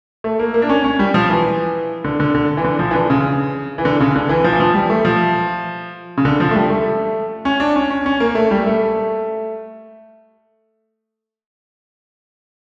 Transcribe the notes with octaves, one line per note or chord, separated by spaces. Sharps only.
A3
A#3
A#3
D4
C#4
C#4
G3
F3
E3
D3
D3
D3
E3
D3
F3
E3
D3
C#3
E3
D3
C#3
D3
E3
F3
E3
F3
G3
A3
F3
C#3
D3
F3
A3
G3
A3
C#4
D4
C#4
C#4
C#4
A#3
A3
G3
A3